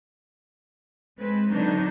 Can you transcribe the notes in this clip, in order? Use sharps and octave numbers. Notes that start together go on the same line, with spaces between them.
G#3 C4 B4
D3 F#3 C4 D4 D#4